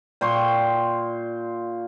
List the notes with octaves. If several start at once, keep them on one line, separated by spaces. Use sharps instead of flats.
A#2 G5 C6 C#6